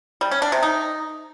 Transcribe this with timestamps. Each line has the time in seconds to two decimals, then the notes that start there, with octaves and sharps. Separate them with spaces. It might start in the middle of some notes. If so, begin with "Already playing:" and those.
0.21 G3
0.31 C#4
0.42 D4
0.52 C3
0.63 D#4